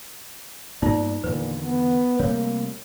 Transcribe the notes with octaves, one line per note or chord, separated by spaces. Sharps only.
G2 A#3 B3 D#4 F4 D5
E2 A#2 D3 D#3 B4
B3
C3 G3 A3 A#3 C#5